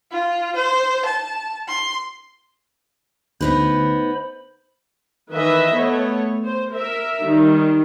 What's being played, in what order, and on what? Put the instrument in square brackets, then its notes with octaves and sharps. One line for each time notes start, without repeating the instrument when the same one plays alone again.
[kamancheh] F4
C5
A5
C6
[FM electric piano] D2 [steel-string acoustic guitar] B3 D#4 B4 [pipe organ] C5 B5
[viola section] D#3 E3 B4 D#5 E5
A3 B3 C#5
C5
A#4 E5
D#3 G3